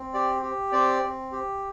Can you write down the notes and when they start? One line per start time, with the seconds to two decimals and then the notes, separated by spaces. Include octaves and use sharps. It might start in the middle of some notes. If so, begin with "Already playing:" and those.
Already playing: C4
0.13 G4 D5
0.43 G4
0.72 C4 D5
1.03 C4
1.32 G4